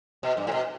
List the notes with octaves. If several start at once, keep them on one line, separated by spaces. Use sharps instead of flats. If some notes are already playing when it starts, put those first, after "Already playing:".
B2
G2
A2
B2